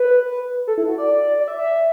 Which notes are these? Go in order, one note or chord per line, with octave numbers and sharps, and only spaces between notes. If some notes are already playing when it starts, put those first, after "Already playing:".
Already playing: B4
A4
E4
F#4
D5
D5
E5